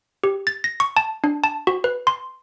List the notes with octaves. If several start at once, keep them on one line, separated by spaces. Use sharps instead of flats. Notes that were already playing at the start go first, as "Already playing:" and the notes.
G4
A6
A#6
C#6
A5
D4
A5
F#4
B4
C6